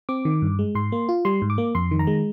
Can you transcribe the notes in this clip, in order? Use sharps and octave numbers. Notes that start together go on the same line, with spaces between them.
C4 D6
D#3
G2
G#3
G#2 C6
A#3
F4
G3 C6
G#2
D6
A#3
F2 C6
D#3
A#5
G#3